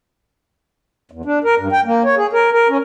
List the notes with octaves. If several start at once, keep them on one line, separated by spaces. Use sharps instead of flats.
E2
D4
A#4
G2
G5
A#3
C#5
G#4
A#4
A#4
C#4